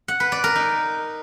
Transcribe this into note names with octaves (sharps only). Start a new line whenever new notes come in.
F#5
B4
D5
A#4
D#4